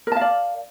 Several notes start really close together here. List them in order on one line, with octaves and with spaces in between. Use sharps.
A#4 A5 F5 D5